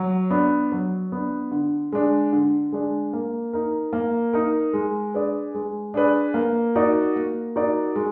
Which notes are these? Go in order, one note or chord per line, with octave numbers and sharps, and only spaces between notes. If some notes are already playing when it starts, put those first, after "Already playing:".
Already playing: F#3
B3 D4
F#3
B3 D4
D3
G#3 D4
D3
G#3 D4
A#3
D#4 A#4
A#3
D#4 A#4
G#3
D4 G#4 B4 D5
G#3
D4 G#4 B4 D5
A#3
D#4 F#4 A#4 D5
A#3
D#4 F#4 A#4 D5
G#3